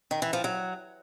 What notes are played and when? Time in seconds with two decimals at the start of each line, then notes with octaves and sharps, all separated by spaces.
0.11 D#3
0.22 E3
0.33 F3
0.44 F#3